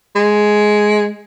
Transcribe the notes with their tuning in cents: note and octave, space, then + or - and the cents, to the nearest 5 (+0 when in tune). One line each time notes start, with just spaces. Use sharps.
G#3 +10